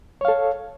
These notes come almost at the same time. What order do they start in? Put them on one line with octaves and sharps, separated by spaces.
C#5 F5 A4